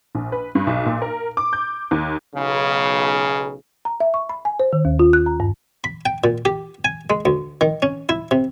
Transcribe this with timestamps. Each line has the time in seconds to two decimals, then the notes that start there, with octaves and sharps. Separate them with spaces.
0.15 A#1
0.32 B4
0.55 G2
0.67 B1
0.86 A#2
1.02 A#4
1.37 D6
1.53 G6
1.91 D#2
2.35 B1 C#3
3.85 A#5
4.00 E5
4.14 C#6
4.29 B5
4.45 G#5
4.60 C5
4.73 D#3
4.85 D#2
4.99 F4
5.13 F#6
5.26 A#5
5.40 G2
5.84 B5
6.06 G5
6.24 A#2
6.45 G4
6.85 G#5
7.10 G#3
7.25 D2
7.61 D#3
7.82 C#4
8.09 E4
8.31 C3